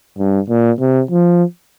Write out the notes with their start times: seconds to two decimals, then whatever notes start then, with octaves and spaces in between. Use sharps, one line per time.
0.18 G2
0.50 A#2
0.80 C3
1.11 F3